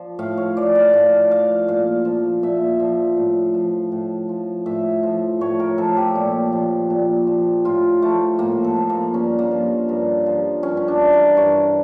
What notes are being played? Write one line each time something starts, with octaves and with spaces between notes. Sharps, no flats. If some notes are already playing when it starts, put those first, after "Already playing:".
Already playing: F3 D5
A2 F5
C#5
F3 D5
F5
A2 F5
F3 F5
A#2 F5
F3
A#2 E5
F3
A2
F3
A2
F3
A2 E5
F3
A2 C#5
A#4
F3 A4
G4
A#2
F3
A#2
F3
A2 F4
F3 A3
A2 A#3
A4
F3
A#3
G2 C#4
A#3
F3
G2
F3
G2 C#4
C#4
D4
E3
A#4
G2 C#5